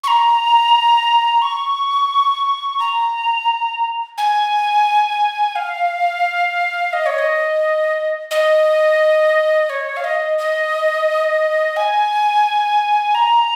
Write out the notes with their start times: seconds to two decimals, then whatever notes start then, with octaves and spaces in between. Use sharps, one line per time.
0.04 C#6
0.08 A#5
1.42 C#6
2.79 A#5
4.18 G#5
5.56 F5
6.93 D#5
7.06 C#5
7.18 D#5
8.31 D#5
9.70 C#5
9.97 F5
10.04 D#5
10.38 D#5
11.76 G#5
13.15 A#5